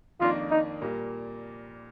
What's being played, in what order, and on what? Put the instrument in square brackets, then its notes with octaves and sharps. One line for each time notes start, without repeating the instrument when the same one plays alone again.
[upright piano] F2 D#3 A#3 D4 [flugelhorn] F4
[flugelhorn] D#4
[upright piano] A#2 G3 A#3